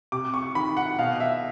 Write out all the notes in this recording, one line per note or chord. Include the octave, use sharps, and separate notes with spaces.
C3 D6
C#6
D#3 B5
F#5
B2 F5
E5